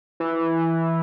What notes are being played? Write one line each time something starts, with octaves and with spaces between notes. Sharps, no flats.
E3